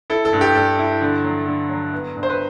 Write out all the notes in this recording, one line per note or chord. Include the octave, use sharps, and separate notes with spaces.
E4 A4
A4
G2
G4
G2 A4
E4
D3
F#3
D3
F#3
B3
G2
C5
B4